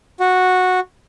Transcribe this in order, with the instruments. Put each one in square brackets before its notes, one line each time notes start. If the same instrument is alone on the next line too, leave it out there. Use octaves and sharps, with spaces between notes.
[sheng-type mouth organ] F#4